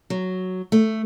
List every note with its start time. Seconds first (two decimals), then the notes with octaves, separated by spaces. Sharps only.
0.10 F#3
0.72 A3